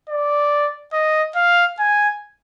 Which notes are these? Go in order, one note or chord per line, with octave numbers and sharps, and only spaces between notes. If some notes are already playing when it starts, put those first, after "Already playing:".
D5
D#5
F5
G#5